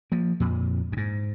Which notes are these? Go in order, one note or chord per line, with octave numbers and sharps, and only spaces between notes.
F3 A#3
F2 A#2
F2
G#2